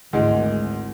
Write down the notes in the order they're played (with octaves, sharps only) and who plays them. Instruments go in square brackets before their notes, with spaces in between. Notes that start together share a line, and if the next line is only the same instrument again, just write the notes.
[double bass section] G#1 [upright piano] D2 E3 G#3